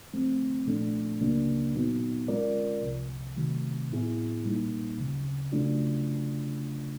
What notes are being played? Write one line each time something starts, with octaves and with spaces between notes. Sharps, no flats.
F3 A3 C4
A#2 F3 A3 D4
C#2 C#3 F#3 A#3 D4
A#2 F#3 B3 D#4
G#3 C#4 F4 A#4 D5
C2 C3 F3
C3 D#3 F#3 A3
A2 F#3 B3 E4 G#4
A#2 G3 A#3 D#4
D2 C#3 F#3
C#3 F#3 A3 D4 F4